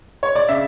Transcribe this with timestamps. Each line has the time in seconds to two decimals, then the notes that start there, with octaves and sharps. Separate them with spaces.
0.23 C#5
0.36 D5
0.49 C#3 E5